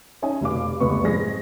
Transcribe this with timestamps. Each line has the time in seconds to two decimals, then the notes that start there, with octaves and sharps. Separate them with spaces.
0.22 C#4 D#4 G#5
0.41 F1 B2 F5 D6
0.80 F1 C#2 B3 B4 C#6
1.04 F2 G#2 G#4 A#6